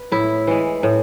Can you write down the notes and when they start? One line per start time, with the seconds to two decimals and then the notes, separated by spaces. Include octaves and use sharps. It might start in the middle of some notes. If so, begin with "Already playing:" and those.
Already playing: B4
0.12 A2 E4
0.47 E3 G#3
0.83 A2